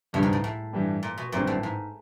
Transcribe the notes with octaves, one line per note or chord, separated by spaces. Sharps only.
C#2 G2 B2 G3
G#2
A2
A2
G2 E3 G3
A#2
B2
G#1 F#2 A#2 D3 G3 C4
A2
G#2